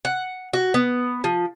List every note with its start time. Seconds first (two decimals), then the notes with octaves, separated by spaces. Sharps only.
0.05 F#5
0.53 F#4
0.74 B3
1.24 F3